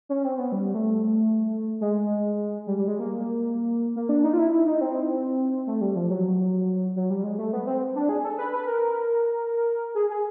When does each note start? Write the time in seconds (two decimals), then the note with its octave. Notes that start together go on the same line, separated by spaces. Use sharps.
0.09 C#4
0.24 C4
0.38 B3
0.52 G3
0.74 A3
1.81 G#3
2.67 G3
2.78 G3
2.88 G#3
2.99 A#3
3.96 A#3
4.09 D4
4.24 D#4
4.33 F4
4.38 E4
4.52 E4
4.67 D#4
4.81 C4
5.67 A3
5.81 G3
5.95 F3
6.10 F#3
6.96 F#3
7.10 G3
7.24 G#3
7.38 A3
7.53 B3
7.67 C4
7.95 D4
8.09 G#4
8.24 A4
8.38 B4
8.52 B4
8.67 A#4
9.95 G#4
10.10 G#4